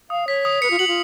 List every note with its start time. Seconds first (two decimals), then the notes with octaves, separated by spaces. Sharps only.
0.10 F5 D#6
0.27 C#5 B6
0.45 D#6
0.62 B4 C#7
0.71 F4
0.79 F#4 F#7
0.88 F4